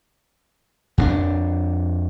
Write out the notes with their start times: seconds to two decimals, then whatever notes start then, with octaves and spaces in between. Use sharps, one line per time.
0.98 F2 A#3 D4